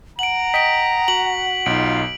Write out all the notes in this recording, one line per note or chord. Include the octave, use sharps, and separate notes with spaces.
F#5 A#5 D7 F#7
D#5 G5 B6 D7
F#4 F#7
B1 D#4 F4 D7